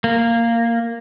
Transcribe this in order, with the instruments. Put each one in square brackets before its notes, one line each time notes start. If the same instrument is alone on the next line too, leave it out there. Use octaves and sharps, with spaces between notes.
[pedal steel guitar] A#3